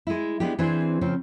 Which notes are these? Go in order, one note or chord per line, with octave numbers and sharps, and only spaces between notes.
G#3 E4
G#3 B3 D4 G4
E3 C4 D4 G#4 C5
C#3 F3 C4